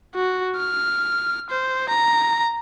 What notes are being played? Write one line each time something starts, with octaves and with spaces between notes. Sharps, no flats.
F#4
F6
C5
A#5